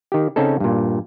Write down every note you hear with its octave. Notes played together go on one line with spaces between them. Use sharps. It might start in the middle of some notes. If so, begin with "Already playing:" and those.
D#3 G4
C#3 C4 C#4 D#4 A4
G2 A#2